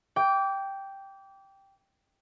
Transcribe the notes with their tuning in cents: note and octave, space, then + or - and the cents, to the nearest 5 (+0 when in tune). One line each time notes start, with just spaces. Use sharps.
G5 +0 D6 -25